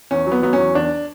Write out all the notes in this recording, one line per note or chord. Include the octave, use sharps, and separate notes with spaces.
E2 C#4
F#3
B3
F#3 B3
C#4
E2
E2 D4